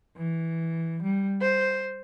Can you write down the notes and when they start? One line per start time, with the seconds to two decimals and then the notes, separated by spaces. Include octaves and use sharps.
0.18 E3
1.03 G3
1.41 C5